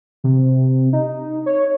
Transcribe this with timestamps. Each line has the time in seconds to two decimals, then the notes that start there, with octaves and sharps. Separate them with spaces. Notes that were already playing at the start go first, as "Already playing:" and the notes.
0.24 C3
0.93 D#4
1.46 C#5